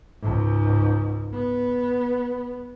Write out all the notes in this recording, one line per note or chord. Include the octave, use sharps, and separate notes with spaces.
C#2 G#2
B3